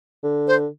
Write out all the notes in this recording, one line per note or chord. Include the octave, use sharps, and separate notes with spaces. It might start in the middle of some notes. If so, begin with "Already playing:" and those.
D3
C5